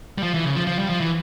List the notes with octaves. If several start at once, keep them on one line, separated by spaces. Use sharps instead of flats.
G3
F3
E3
C#3
F3
F3
G3
F3
E3